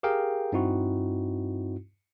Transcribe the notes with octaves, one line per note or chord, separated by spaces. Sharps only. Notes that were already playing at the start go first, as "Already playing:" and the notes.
G4 G#4 A#4 F5 G5
G2 C4 D#4 E4 F#4